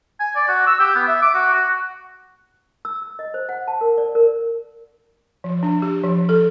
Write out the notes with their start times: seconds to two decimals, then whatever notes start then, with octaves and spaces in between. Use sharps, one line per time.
0.20 G#5
0.36 D5
0.48 F#4
0.67 E6
0.80 G4
0.95 B3
1.08 E5
1.22 D6
1.34 F#4
1.54 F#4
2.85 E6
3.02 E6
3.19 D#5
3.34 C5
3.49 F#5
3.68 A5
3.81 A#4
3.98 D5
4.15 A#4
5.44 F3
5.63 D4
5.82 G4
6.03 F3
6.29 A4